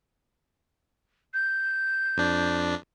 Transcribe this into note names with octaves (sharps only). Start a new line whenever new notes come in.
G6
F2 D4